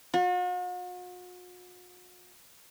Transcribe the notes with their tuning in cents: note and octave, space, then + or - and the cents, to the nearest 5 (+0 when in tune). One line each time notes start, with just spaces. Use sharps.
F#4 -45